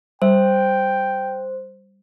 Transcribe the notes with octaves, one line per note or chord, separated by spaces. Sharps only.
G3 C5 G5